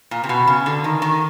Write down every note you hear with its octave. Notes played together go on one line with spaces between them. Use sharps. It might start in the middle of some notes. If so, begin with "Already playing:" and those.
A#2
C3
B2
C#3
D3
D#3
D#3